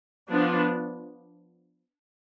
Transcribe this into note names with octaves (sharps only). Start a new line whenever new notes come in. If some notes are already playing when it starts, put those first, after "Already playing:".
F3 B3 D4